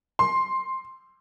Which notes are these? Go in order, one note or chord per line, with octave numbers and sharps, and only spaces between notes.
C6